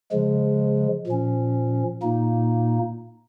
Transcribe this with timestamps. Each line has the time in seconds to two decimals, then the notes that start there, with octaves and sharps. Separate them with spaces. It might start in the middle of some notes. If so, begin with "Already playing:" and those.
0.12 C#3 F3 G#3
1.07 A#2 F3 C#4
2.02 A#2 A#3 D#4